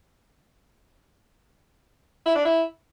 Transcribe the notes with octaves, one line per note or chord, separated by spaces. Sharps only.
E4
D4
E4